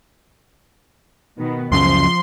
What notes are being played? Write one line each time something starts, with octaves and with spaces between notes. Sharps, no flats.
B2 D#3 B3
C#2 F#2 C#3 F3 C6